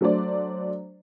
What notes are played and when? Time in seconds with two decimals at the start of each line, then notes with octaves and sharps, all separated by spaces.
0.01 F#3 A3 D4 C5 D5